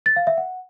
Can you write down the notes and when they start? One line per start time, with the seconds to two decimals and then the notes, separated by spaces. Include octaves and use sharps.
0.06 A6
0.16 F5
0.27 E5
0.38 F#5